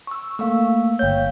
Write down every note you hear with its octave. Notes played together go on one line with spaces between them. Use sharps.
C#6 E6
A3 A#3 F5 C#6 E6
G1 C#5 F5 G5 G6